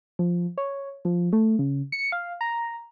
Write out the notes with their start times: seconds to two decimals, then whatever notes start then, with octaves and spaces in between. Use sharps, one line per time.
0.19 F3
0.58 C#5
1.05 F3
1.33 A3
1.59 C#3
1.92 C#7
2.12 F5
2.41 A#5